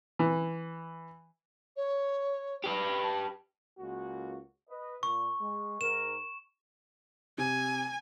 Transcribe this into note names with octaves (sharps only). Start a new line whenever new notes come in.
E3
C#5
G4 B4
A5
C#2 A#3 F#4
B4 D#5
A#2 C#6
G#3
G#2 A#4 E7
C3 G#5